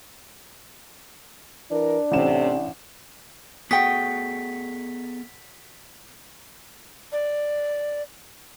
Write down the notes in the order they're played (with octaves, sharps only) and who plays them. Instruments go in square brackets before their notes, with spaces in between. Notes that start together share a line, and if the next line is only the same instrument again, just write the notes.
[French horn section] E3 A#4 [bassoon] D4
[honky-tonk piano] A1 E7 [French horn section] A2 C3
[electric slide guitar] B3 G#4 A4 [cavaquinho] F#4 G5 D#6 [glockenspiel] B6
[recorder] D5